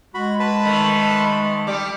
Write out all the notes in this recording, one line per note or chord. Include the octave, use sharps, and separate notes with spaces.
G#3 F#4 B5
B4 A5 B5
D#3 A3
G3 G4 D6